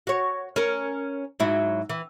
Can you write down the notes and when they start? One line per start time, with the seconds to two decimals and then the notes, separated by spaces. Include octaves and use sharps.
0.07 F#4 C#5
0.56 C#4 A#4
1.40 G#2 F#3 E4
1.90 E3